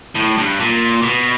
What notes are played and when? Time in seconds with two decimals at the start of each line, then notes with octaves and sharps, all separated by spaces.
0.15 A2
0.38 G2
0.60 A#2
1.03 B2